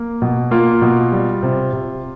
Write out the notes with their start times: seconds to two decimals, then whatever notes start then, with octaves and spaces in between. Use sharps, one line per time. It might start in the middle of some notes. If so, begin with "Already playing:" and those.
Already playing: A#3
0.22 B2
0.51 A#3 F4
0.82 B2
1.12 G3
1.43 C3
1.73 C3